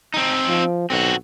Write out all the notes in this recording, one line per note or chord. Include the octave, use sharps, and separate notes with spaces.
C4 D#4
F3
B1 C4 F#4